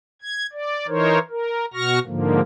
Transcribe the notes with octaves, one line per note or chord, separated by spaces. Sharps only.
G#6
D5
E3 D#4 A#4 C5 C#5
A#4
B2 F#4 C#6 F6 A#6
G#2 D3 F3 A#3